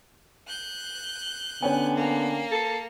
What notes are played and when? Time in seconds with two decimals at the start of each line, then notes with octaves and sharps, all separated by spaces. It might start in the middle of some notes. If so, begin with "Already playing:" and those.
0.48 F#6 G6
1.62 D3 B3 C#4 G5 G#5
1.95 A#3
2.52 A4